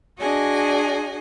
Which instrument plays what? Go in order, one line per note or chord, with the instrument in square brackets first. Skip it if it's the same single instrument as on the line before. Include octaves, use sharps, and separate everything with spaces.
[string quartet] D4 F#4 G#4 D#5 G#5